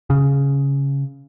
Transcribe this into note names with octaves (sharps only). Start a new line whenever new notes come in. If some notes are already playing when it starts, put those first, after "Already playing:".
C#3